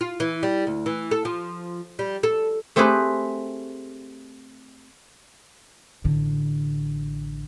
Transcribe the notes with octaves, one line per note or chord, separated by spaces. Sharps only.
F4
E3
G3
D2
E3
A4
F3
G3
A4
A3 C4 G4 G#4 B4
A1 D3